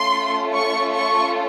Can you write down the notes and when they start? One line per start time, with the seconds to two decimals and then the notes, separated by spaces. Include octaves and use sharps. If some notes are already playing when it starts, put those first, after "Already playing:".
Already playing: A3 C#4 F4 A4 C6
0.55 C#6
0.94 C#6